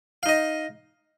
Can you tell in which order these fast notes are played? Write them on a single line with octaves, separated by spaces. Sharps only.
F5 D#4 D#5